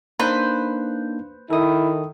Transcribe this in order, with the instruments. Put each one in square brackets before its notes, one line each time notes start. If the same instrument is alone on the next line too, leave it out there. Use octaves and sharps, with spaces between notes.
[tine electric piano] A#3 D4 D#4 [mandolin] B4 C5
[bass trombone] D#3 [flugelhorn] E4 [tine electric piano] A4 D#6